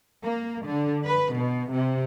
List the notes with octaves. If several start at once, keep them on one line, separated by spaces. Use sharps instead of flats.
A#3
D3
B4
B2
C3